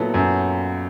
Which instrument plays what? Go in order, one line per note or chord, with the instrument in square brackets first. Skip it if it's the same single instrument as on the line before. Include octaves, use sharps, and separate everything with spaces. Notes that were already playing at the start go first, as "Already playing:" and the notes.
Already playing: [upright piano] A#2 F#3 B3 E4 A4
[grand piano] F#2